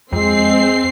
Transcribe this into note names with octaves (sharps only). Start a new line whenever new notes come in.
F2 G#3 C4 C7